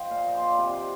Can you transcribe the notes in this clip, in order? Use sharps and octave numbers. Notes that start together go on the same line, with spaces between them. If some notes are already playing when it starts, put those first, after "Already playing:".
Already playing: F3 D#5 G5
A#2 F5
D#5
F3 C5
D5
C3